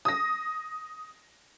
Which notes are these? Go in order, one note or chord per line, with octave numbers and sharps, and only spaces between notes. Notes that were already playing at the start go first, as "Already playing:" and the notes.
D#6 A#6